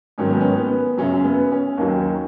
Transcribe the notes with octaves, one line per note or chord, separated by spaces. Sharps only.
G#2 D#3 F#3 C#4
B3
C#4
B3
F#2 C#3 F#3 C#4
B3
C#4
D#2 D#3 F#3